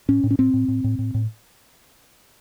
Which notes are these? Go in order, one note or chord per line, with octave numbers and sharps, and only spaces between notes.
A2 C#4
A2
C#4
A2 C4
A2
A2
A2
A2
A2